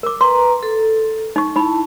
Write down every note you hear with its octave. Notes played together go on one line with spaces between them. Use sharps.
A#4 D6
B4 A#5 C6
A4
D#4 C#6
D#4 E4 A5 B5